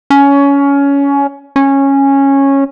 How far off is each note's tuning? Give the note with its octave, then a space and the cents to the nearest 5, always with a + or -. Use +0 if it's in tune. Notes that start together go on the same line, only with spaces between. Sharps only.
C#4 +20
C#4 -10